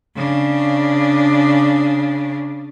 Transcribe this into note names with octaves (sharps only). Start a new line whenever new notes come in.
C#3 D4